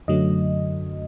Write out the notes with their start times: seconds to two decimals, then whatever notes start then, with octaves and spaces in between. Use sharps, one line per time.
0.08 F#2 D3 F#3 A3 D#5